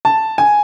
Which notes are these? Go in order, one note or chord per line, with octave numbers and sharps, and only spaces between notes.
A5
G#5